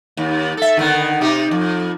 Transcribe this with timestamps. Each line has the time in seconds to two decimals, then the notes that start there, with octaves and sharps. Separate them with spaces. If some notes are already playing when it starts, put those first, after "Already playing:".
0.17 D#2
0.57 A4 E5
0.77 D3 D#3 B3
1.21 C3 D#4 G4
1.51 F2